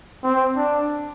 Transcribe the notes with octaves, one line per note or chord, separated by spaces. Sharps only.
C4
D4